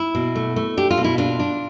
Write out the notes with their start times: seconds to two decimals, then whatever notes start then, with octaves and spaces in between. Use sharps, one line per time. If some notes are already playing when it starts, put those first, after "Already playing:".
Already playing: E4
0.15 B2
0.36 A3
0.56 A3
0.77 D4 G4
0.91 F4
0.97 B2
1.04 E4
1.18 D4 F4
1.40 D4